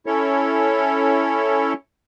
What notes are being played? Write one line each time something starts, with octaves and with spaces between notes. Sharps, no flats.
C#4 E4 A4 C#5